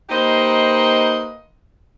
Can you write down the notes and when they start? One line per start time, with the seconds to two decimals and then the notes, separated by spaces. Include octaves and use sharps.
0.10 A#3 D#4 G4 B4 C5 D#5